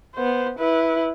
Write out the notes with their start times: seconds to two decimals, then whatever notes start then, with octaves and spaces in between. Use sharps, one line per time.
0.15 B3 C5
0.59 E4 B4